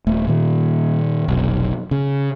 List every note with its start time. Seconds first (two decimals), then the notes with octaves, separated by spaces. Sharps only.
0.07 D#1 A3
0.27 A#2 D#3
1.28 F1 B1
1.91 C#3